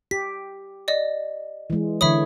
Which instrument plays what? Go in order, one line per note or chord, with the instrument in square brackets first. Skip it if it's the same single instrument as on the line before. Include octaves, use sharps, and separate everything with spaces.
[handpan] G4 [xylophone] B6
[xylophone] D5 D#5
[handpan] E3 G#3
[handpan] D3 E3 C#5 [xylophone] E5 B5 D#6